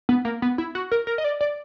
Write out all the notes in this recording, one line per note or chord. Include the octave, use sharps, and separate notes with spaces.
B3
A#3
B3
E4
F#4
A#4
A#4
D#5
D5
D5